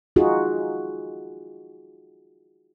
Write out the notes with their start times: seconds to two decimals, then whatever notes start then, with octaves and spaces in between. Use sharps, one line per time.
0.16 D#4 F4 F#4 G#4